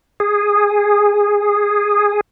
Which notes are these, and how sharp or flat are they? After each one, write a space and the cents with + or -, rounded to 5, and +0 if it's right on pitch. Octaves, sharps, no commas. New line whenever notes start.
G#4 -10